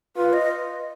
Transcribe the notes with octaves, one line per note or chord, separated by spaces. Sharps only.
F4 B4
D#5